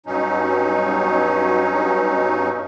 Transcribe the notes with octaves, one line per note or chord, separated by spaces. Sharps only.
G2 B2 F#3 C#4 D#4